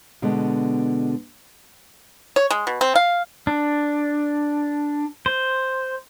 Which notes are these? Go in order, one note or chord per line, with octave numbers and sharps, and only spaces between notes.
B2 D3 G#3 B3
C#5
G#3
B2
C4
F5
D4
C5